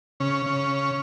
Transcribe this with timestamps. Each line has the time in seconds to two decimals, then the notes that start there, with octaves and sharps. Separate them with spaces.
0.20 C#3 C#4
0.46 C#3